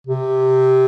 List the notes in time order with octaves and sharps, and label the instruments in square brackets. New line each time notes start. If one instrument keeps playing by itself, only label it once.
[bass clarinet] C3